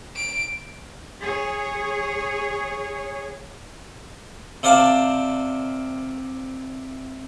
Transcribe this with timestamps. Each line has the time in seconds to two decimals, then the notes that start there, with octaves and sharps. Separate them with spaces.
0.16 D7
1.21 G#4 C#5
4.63 C3 C5 D5 F5 A5